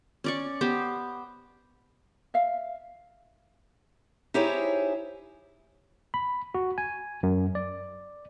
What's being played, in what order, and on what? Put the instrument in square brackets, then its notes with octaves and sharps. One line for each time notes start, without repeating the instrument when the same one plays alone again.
[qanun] C#4 D5 C#6
B3 G4 C5
[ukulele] E5 F5
[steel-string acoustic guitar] D#4 E4 G4 G#4 C5 C#5
[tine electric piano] B5
F#4
G#5
F#2
D5